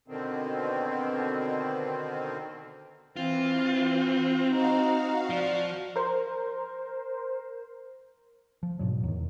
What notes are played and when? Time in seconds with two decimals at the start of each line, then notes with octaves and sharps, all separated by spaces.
0.08 B2 D3 D#3 C4
3.16 E3 C4 F4
4.48 D#4 F#4 F5
5.30 F3 D5
5.96 A#4 C5
8.63 F3
8.79 G#2 B2 F#3
9.03 E2 D#3